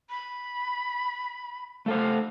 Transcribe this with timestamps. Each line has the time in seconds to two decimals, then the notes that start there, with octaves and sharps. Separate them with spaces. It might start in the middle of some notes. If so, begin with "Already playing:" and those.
0.10 B5
1.86 A3 A4 C5 F5